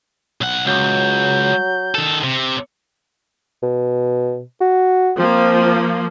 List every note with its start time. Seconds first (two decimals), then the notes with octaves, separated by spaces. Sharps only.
0.41 B1 F#5
0.67 C#2 F#3 G6
1.95 D#3 A4
2.23 C3
3.63 B2
4.61 F#4
5.18 F3 A#3 C4